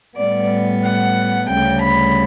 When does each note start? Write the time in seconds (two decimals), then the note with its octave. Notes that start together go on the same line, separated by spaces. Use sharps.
0.17 A2 G3 B3 D5
0.84 F#5
1.49 D2 C#3 G3 G5
1.82 B5